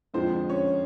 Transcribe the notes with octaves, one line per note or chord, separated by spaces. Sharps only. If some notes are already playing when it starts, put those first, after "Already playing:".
F2 D3 F3 G#3 C4 C5
C#4 C#5